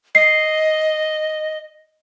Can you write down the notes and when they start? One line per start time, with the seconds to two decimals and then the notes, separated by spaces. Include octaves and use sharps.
0.15 D#5 C7